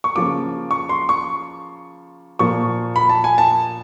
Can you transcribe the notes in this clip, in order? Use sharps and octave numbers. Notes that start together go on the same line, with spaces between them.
C#6
C#3 F3 A#3 D6
C#6
C6
C#6
A#2 F3 A#3 C#6
B5
A5
G#5
A5